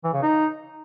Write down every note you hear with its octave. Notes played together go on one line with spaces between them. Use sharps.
E3
C#3
D#4